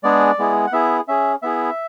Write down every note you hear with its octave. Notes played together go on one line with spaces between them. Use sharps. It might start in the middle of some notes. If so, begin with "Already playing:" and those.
G#3 B3 D4 G#4 D5
G#3 B3 E4 G#4
F#5
B3 E4 G#4 E5
C#4 G#4 E5
B3 E4 G#4 E5